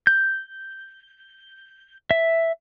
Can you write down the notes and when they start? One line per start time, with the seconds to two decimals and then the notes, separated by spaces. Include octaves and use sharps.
0.07 G6
2.11 E5